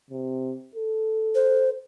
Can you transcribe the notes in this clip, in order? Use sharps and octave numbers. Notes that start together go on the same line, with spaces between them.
C3
A4
C5